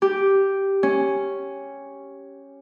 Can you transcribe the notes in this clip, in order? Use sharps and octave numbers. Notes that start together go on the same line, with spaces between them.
G4
C#4